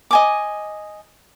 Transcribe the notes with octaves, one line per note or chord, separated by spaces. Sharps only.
D#5 G#5 D6